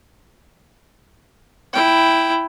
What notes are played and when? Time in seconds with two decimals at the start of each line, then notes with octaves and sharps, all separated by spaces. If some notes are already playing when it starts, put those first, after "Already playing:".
1.74 E4 G5